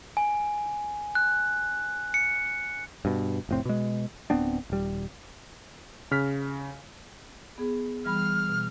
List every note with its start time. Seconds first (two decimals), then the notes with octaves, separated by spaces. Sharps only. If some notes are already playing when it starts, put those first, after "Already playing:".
0.17 G#5
1.15 F#6
2.14 C#7
3.05 G2 B2
3.49 F1 A2 C4
3.65 B2 G#3
4.30 D1 B3 C4 D4
4.70 D#1 G3
6.11 C#3 F6 B6
7.58 B3 G#4
8.05 E3 G3 B5 F6
8.49 B2